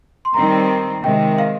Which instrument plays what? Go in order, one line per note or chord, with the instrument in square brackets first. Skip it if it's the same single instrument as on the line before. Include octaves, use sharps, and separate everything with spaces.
[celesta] C6
[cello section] D#3 G3 C4 [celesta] A#5
[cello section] C3 D#3 G#3 [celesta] G5
[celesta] F5